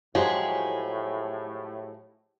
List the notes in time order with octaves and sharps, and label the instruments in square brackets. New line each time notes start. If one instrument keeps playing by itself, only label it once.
[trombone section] A2 [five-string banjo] F3 F#3 G#3 [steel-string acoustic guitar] G4 G#4